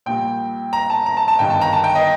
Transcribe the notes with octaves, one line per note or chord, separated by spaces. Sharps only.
A#1 A#2 G3 G5
A#5
A5
A#5
A5
A5
G1 G2 D#3 G3 G5
A5
A#5
A5
G5
D#5